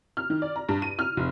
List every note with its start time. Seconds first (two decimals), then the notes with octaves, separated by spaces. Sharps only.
0.17 F6
0.30 D#3
0.42 D5
0.56 A#5
0.69 G2
0.82 D#7
0.99 F6
1.17 F1